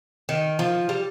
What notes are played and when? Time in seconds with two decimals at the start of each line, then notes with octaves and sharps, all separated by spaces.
0.29 D#3
0.59 F3
0.89 G3